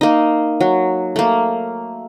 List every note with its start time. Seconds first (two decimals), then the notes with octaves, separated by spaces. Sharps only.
0.01 A#3 D#4
0.61 F#3
1.16 A3 A#3